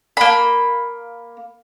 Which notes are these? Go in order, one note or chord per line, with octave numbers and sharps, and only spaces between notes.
A#3 B5